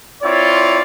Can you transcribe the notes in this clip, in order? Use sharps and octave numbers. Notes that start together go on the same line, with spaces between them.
C4 E4 F4 C#5 D5